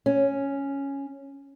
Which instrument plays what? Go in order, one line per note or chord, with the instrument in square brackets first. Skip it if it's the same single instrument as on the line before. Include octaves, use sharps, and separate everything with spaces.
[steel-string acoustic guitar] C#4